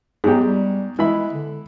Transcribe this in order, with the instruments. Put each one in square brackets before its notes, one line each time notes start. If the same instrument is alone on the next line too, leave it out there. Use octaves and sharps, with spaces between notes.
[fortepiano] G#2 F#3 G4 [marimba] B3 G#4
[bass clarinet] G3
[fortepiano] E3 E5 B5 [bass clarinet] G#3
[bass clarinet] D3